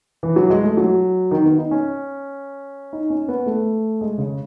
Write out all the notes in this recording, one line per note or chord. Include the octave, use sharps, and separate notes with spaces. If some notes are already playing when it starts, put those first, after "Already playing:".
E3
F#3
G#3
A3
F#3
D#3
B3
D#4
C#4
D#4
C#4
B3
A3
G#3
C#3